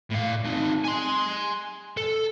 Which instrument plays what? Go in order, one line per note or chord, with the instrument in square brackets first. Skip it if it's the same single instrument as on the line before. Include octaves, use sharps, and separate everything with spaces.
[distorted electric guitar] A2 F5
C4 D#4
G#5 C6
A4